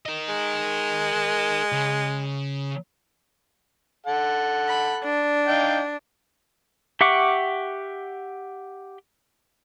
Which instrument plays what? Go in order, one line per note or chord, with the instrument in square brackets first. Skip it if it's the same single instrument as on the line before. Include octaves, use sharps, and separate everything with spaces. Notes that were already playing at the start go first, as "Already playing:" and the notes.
[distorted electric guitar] A#4 D#5
[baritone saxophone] G#3
[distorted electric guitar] C#3
[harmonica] A4 F#5
[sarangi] B5
D4
[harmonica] D#4 F5 G5
[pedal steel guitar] G4 E5 F#5 C#6 D6